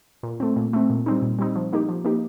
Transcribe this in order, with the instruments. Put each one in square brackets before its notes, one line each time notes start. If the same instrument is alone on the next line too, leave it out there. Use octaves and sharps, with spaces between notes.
[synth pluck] A#2
A3 C4
A#2
A3 C4
A#2
G3 C4 D#4
A#2
G3 C4 D#4
F3
A#3 D#4 G4
F3
A#3 D#4 G4